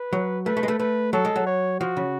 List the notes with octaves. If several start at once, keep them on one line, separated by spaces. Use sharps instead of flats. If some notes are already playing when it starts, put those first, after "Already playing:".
Already playing: B4
F#3
A3 B4
A3
G#3
A3
A3 B4
F#3 A4
G#3
F#3
C#5
F3 F#4
C#3